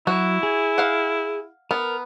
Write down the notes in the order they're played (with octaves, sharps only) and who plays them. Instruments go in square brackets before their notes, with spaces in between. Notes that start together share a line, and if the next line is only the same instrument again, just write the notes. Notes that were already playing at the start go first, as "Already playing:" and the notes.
[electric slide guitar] F#3 [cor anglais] E4 [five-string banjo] F#4
[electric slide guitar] G#4
[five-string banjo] F5 F#5
[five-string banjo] B3 [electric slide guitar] A#4